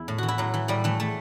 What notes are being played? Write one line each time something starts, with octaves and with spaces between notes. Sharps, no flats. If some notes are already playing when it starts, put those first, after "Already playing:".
Already playing: E2 E4
A2
E3 F#4
E4
A2 F#3
E3
A2 G3
E3 A3
A3